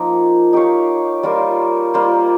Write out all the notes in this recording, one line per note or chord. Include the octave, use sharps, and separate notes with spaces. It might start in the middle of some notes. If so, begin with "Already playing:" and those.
Already playing: F3 A#3 D#4
D#4 G4 C#5 F5
G3 A#3 F4 A#4
G3 A#3 F4 C5